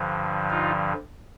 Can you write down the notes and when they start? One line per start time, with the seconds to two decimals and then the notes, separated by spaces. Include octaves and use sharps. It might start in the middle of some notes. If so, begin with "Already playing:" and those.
Already playing: G2 D3 F3
0.50 D#4 F4